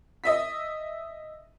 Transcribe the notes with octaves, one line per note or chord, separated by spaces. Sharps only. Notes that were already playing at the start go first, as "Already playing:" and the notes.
D#5 E5 B6